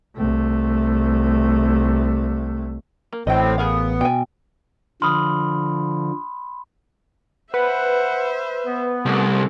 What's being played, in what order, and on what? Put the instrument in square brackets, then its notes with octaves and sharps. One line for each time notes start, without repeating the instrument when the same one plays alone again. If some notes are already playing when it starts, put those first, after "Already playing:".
[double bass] C2 A3
[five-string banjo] A#3
[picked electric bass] A1 [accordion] A2 C4 [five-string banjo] D#5 G5
[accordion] B3 [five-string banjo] G#4 A#4 F5
[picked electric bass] B2 [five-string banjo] G5 G#5
[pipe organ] D3 F3 [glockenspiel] B5 C6 [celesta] D#6 F6
[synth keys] B4 [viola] C5 E5 [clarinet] F#5
[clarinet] B3
[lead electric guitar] C2 [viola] A3